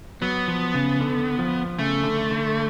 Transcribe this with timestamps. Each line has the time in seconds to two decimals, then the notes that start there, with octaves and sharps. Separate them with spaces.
0.22 F#3 B3
0.48 F3
0.74 C#3
1.01 D3
1.39 F3
1.78 C#3 A3
2.04 D3
2.31 D3